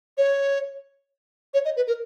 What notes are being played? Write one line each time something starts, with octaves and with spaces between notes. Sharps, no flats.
C#5
C#5
D#5
B4
A#4